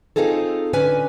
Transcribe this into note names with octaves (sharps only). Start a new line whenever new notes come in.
C4 D#4 F4 G#4 A4
D3 C#4 B4 G#5